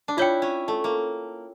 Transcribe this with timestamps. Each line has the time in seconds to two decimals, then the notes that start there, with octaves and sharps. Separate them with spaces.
0.08 D4
0.17 E4 F4 C#5 G5
0.42 C#4
0.68 A3
0.84 A#3